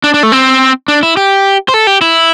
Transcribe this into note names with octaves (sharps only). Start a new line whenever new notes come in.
D4
D4
A3
C4
D4
E4
G4
C5
A4
G4
E4